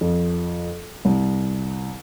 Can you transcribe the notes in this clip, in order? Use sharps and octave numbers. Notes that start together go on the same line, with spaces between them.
F2
C2